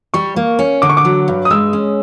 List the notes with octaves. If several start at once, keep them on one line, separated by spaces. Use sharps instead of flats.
G3 C#6
A#3
C#4
D3 D6
C#6
D6
F#3
G2
D#6
G#3 E6
C#4